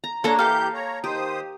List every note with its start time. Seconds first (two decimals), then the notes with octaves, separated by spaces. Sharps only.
0.04 A#5
0.24 A#3 D4 A4 C#5 A#5
0.39 E3 G4 A4 F5 G6
0.74 C#5 A#5
1.04 D#3 G4 C5 D#6